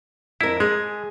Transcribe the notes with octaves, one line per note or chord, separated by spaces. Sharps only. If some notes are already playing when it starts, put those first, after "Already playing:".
F2 E4 A#4
G#3 G#4